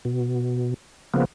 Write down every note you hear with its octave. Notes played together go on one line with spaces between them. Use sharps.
B2
C#3 F3 A#3 B3